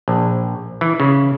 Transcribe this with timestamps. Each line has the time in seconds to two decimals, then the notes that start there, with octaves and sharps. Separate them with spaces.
0.08 A#1
0.81 E3
1.00 C#3